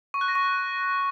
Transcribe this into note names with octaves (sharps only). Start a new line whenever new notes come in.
C#6
F#6
A#6
C#6